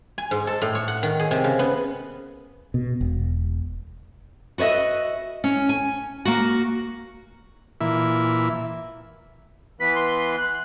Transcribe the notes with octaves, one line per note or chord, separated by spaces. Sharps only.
G#5
G#2
A4
A2
C#5
F#5
D#3
G#4
C3
C#3
B3
B2
E1
F#4 B4 C#5 D#5 E5
C#4
G#5
A#3 F#4
A#2 E3 E4
E3 B3 B4 B6
C6
F#6